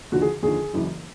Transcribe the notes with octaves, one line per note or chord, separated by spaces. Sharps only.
D#2 D3 F3 F#4
G#4
D#2 D3 F3 G#4
F#1 F#2 C#3 E3